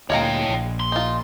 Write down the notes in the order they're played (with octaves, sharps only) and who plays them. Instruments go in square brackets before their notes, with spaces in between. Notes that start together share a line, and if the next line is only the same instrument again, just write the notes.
[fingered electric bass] D2 A#2 [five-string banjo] G#3 F5 A#5 [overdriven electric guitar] C#5 G5
[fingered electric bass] A#1
[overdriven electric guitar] C6
[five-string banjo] D#4 F4